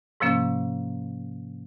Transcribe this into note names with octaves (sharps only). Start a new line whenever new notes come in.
G#2 C3 F3 A#3 C#4